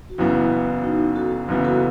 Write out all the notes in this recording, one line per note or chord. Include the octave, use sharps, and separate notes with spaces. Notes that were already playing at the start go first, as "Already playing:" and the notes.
F#4
F#1 F#2 C#3 E3 B3 E4
D#4 F#4
F#4 A4
F#1 F#2 C#3 E3 B3
F#4 A4